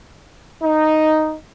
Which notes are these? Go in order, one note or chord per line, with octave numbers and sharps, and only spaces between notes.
D#4